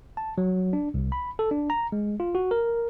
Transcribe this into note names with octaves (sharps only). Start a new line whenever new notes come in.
A5
F#3
D4
C2
B5
A4
D4
A#5
G#3
F4
F#4
A#4